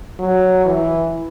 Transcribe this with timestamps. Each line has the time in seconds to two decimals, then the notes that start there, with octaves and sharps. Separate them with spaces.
0.19 F#3
0.65 E3